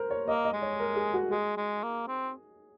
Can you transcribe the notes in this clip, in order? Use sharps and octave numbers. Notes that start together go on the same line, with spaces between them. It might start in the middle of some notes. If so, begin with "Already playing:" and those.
Already playing: A#4 C5
C#5
A#3 D#5
D#5
G#3
C#5
A#4
G#4
F#4
G#3 G#4
G#3
A#3
C4